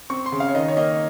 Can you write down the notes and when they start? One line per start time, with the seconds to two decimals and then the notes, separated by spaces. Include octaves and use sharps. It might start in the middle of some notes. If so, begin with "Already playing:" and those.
0.10 C4 C#6
0.26 C6
0.32 C#3
0.40 F5
0.49 C#5
0.54 D#3 D#5
0.68 C#5
0.77 A#3 D#5